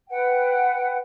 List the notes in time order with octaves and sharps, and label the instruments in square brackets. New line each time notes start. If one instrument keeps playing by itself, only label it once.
[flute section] B4 F#5 G5